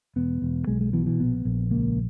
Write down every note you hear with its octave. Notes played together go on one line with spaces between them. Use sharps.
E1 B3
E1
B1 G#3
G#3
B2 E3
E3
A#1 B3
A#1
C#2 A#3